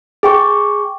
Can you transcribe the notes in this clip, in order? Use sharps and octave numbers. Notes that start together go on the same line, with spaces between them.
G#4 G5 C#6